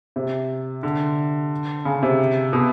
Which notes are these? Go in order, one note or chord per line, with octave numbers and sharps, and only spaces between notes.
C3
D3
C#3
C3
B2